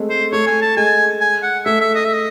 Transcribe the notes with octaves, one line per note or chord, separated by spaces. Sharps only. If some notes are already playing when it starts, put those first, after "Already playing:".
Already playing: G#3 A3 C4
C5
A3 C#5
G#5
A5
G#3 G#5
G#5
F#5
A3 E5
E5
D#5
E5
D#5